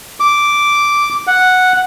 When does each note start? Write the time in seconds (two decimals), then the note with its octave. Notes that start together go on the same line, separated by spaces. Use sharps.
0.20 D6
1.27 F#5